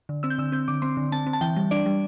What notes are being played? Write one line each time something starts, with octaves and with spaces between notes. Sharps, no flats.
D3
C4 E6
G6
D3 E6
C4 G6
D3 D6
C4 C6
D3
C4 A5
C4
A5
E3 G5
G3
D4 D5
G3